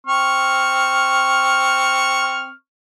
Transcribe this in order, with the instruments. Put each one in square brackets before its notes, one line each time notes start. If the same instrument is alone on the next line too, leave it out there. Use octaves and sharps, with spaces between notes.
[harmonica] C4 C#6 F6